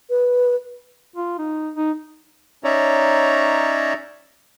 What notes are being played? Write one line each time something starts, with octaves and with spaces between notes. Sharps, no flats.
B4
F4
D#4
D#4
C#4 D#4 C#5 D5 E5 A#5